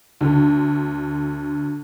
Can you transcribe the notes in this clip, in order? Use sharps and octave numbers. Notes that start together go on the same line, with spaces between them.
D2 D3